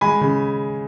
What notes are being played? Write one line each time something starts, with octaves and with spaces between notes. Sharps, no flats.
G#3 G#5 B5
C#3